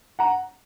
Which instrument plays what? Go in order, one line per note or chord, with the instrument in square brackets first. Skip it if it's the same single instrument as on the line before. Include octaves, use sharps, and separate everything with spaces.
[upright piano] F#5 A#5